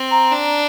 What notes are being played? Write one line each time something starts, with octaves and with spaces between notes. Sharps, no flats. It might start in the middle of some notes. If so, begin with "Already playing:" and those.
Already playing: C4
A#5
D4